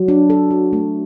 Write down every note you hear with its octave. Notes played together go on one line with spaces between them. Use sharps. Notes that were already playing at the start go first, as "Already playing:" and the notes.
Already playing: F#3
D4
A4
F#4
A3